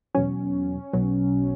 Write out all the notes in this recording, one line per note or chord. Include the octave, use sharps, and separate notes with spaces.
E2 B2 F#3 C#4
B1 B2 F#3